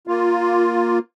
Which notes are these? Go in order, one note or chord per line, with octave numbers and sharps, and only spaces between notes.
A#3 F4